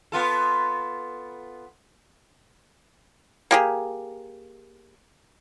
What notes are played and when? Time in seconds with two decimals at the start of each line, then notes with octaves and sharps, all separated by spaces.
0.12 B3 F4 A4
3.51 A#3 G4 G#4